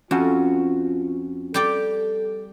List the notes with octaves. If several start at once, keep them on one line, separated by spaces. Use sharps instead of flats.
F2 C#4 F4 F#4 F#5
G3 G4 A4 D5